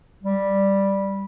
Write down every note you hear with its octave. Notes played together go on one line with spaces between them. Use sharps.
G3